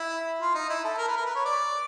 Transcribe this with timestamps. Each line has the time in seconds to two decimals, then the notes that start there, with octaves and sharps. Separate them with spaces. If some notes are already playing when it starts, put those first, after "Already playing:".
Already playing: E4
0.41 F4
0.55 D#4
0.70 E4
0.84 A4
0.98 A#4
1.07 B4
1.17 A#4
1.26 B4
1.35 C#5
1.45 D5